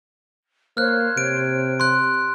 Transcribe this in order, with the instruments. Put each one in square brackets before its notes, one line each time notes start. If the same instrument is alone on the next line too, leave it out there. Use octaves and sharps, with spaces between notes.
[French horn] A#3 [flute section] C5 C#5 [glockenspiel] F6 F#6
[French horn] C3 [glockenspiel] D7
[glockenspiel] C6 F#6